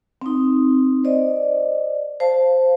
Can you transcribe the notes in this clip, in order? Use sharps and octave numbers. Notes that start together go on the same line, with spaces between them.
C4 D#4
C5 D5 D#5
C5 F5 A5